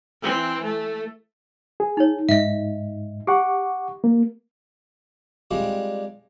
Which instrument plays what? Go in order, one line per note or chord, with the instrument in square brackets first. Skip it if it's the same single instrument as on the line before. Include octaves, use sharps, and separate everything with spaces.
[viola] E3 C4
A3
[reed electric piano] G#4
[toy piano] D#4 C#5
[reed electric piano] G#2 [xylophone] D#5 E5
[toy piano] G4 [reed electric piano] F#5 C#6 D6
[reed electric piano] A#3
[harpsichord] G3 G#3 C4 D4 F4